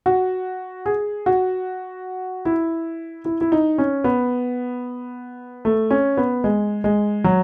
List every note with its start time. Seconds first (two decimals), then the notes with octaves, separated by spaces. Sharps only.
0.06 F#4
0.86 G#4
1.26 F#4
2.45 E4
3.25 E4
3.41 E4
3.52 D#4
3.78 C#4
4.04 B3
5.65 A3
5.91 C#4
6.17 B3
6.44 G#3
6.84 G#3
7.24 F#3